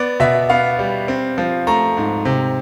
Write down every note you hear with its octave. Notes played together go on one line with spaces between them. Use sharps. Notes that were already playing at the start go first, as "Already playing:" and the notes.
Already playing: B3 D5
B2 E5
B3 F5
G3
C4
F3
A3 A#5
G#2
C3